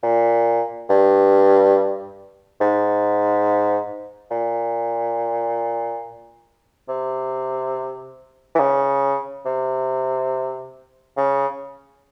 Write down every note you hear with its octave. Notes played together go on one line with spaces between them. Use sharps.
A#2
G2
G#2
A#2
C3
E3
C#3
C3
C#3